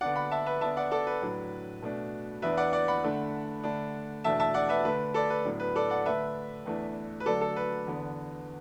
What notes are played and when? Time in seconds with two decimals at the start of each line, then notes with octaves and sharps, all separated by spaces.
0.01 D3 B3 D4 D5 F#5
0.16 F#5 B5
0.31 E5 A5
0.46 B4 E5
0.61 D3 B3 D4 E5 A5
0.77 D5 F#5
0.91 A4 D5
1.07 B4
1.22 A2 F#3 D4
1.82 B2 A3 D4
2.42 E2 E3 B3 D4 B4 E5
2.57 D5 F#5
2.73 D5 F#5
2.88 F#5 B5
3.04 D3 A3 D4
3.64 D3 A3 D4
4.24 E2 B2 A3 D4 E5 A5
4.40 E5 A5
4.54 D5 F#5
4.69 B4 E5
4.85 D3 A3 D4 B4
5.14 A4 D5
5.30 B4
5.45 A2 F#3 B3 D4
5.60 B4
5.76 A4 D5
5.90 D5 F#5
6.05 D3 A3 D4 B4 E5
6.66 E2 E3 A3 D4
7.20 B4
7.26 D3 F#3 A3 D4 A4 D5
7.41 A4
7.56 B4
7.87 E2 D3 B3